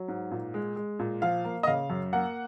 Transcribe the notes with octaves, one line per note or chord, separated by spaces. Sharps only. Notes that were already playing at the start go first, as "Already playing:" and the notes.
Already playing: F#3
G#2
A#2
G#3
G#3
A#2
F3 F5
A#3
D#5
C#3 F5
F#2
A#3 F#5